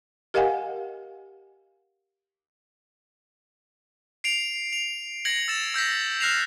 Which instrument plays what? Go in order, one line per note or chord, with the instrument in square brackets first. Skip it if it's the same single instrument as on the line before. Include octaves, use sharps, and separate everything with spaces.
[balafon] G4 A#4 D#5 F5 F#5 G#5
[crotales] C7 D7 F7
F7
G#6 A#6 C#7 F#7
E6 A6 E7
E6 G6 A#6 B6
F6 F#6 A#6 C7 E7 F7